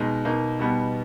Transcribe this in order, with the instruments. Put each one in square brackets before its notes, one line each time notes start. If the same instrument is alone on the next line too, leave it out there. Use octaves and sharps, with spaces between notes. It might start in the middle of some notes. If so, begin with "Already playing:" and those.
Already playing: [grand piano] B2 G#3 D#4
B2 A#3 D#4
B2 G3 B3 D#4